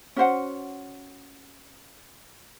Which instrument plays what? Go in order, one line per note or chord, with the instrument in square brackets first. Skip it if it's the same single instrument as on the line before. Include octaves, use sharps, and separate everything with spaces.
[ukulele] C#4 F#4 C5 F#5